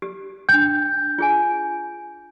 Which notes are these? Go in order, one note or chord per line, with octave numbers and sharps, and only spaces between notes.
G4
D4 G5 G6
F4 G#4 G#5